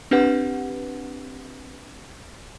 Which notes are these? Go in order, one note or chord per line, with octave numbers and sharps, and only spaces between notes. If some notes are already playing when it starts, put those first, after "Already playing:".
C4 D4 G4 B4 F#5